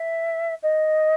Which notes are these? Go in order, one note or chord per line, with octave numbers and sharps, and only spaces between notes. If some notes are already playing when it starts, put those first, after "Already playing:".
Already playing: E5
D#5